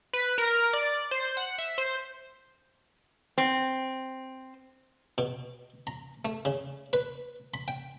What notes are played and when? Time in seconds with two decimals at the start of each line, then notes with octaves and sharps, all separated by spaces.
0.13 B4
0.38 A#4
0.73 D5
1.11 C5
1.37 F#5
1.58 E5
1.78 C5
3.38 C4
5.18 B2
5.87 A#5
6.25 A3
6.45 C#3
6.93 B4
7.54 B5
7.68 G5